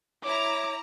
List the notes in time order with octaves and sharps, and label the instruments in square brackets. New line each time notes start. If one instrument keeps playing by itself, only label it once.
[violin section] E4 A#5 [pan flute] C#5 [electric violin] D6